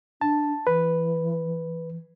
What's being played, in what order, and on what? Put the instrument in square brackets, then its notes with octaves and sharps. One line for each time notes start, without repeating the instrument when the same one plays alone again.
[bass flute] D4 [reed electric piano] A5
[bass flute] E3 [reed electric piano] B4